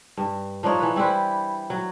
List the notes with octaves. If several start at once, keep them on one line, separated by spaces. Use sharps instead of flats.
G2
F3 D4 D#4 C#5
E3 B4
G3 E4 B4 C5
F#3